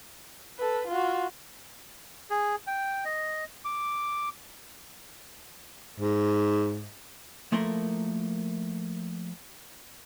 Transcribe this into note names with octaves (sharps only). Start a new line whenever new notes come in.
A4 B4
F4 F#4
G#4
G5
D#5
D6
G#2
F3 A3 A#3 E4 A#4 C6